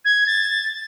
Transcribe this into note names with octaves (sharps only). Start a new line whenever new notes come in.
G#6
A6